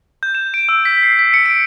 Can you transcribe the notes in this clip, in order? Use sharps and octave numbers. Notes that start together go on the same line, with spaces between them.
G6
E7
D7
E6
B6
C7
B6
C#7
D7